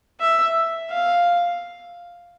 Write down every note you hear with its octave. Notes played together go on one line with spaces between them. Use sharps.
E5
F5